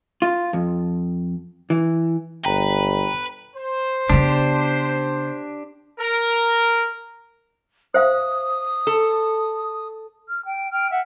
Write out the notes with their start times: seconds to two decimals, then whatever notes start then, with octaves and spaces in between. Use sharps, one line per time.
0.22 F4
0.53 F2
1.70 E3
2.45 G1 B4 G5 A#5
3.56 C5
4.10 C#3 B3 D4 G4
5.99 A#4
7.94 C5 E5 F5 D#6
8.87 A4
10.28 F6
10.46 G5
10.72 G5 F6
10.91 E5 F#5